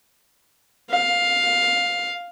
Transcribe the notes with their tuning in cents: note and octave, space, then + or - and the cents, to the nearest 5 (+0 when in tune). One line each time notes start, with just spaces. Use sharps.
F5 +10